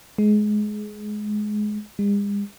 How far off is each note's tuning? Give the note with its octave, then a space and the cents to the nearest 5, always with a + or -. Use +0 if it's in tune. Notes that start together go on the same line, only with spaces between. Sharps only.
G#3 +20
G#3 -45